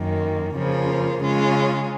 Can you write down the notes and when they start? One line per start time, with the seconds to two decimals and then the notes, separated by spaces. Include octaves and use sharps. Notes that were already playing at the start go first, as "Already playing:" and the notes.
Already playing: F#2 D#3 A#3
0.54 F2 C#3 F3 A#3 F4
1.20 C#3 G#3 C#4 F4